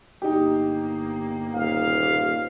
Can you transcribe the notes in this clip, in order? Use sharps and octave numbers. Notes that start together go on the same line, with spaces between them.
G1 A#3 D#4 G4
D#1 F5